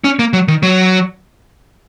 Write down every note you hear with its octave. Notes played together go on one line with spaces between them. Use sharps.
C#4
A#3
F#3
D#3
F#3